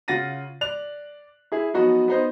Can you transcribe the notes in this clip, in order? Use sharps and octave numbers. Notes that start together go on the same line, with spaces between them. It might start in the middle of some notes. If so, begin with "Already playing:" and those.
C#3 F4 F#5 A6 A#6 D#7
D5 F#6 F7
E4 G#4 E5
F3 F#3 B3 D#4 F#4
B3 D#4 C5